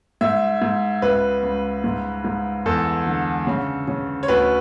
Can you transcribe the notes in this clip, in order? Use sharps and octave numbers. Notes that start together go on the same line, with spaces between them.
G#2 E5
G#2
C#2 B4
C#2
G#2
G#2
E2 A4
D3
C#3
C#3
C#5
D2 B4